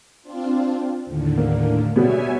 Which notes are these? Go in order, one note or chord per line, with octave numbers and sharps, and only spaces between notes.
C4 D4 F4
D#2 A2 D3
A#3
B2 G3 B3 C#5 E5 G#5